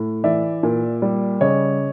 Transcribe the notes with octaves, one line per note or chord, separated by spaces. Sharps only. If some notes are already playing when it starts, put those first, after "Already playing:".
Already playing: A2
E3 D5 E5
A#2
G3
C#3 C#5 D#5